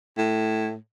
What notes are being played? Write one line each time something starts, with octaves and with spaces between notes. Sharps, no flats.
A2